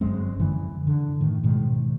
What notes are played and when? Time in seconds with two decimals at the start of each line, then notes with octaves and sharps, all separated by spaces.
0.01 G1 F#2 G#3 C4
0.40 F#2 D3 E3
0.87 D3
1.21 A2 D#3
1.43 G#2 B2 D#3 G#3